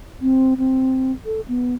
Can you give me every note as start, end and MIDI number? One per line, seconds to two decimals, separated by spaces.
0.21 0.54 60
0.58 1.12 60
1.26 1.41 69
1.48 1.75 59